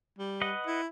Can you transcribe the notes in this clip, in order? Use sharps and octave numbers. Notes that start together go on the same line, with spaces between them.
G3
B4 D#5 F#5
E4